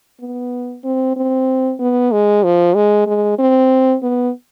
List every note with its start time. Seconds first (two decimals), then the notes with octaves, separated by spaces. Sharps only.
0.20 B3
0.84 C4
1.16 C4
1.80 B3
2.12 G#3
2.44 F3
2.76 G#3
3.06 G#3
3.39 C4
4.02 B3